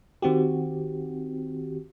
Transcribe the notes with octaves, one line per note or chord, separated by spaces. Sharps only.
D#3 C4 F#4 G4